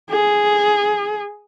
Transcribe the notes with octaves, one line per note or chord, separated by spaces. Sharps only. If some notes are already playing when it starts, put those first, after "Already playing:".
G#4